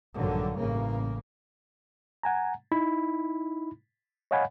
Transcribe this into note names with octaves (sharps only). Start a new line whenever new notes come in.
A#1 G2 D3 D#3 F#3
A1 C#3 A#3
F#5 G#5 A#5
D#4 E4 B5
C#5 D#5 F5 F#5 G#5 B5